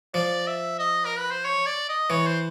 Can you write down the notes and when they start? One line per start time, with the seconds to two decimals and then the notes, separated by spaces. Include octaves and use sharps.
0.14 F3 D5
0.47 E5
0.79 D#5
1.06 A#4
1.18 B4
1.31 C5
1.45 C#5
1.66 D5
1.89 D#5
2.10 E3 C#5
2.27 C5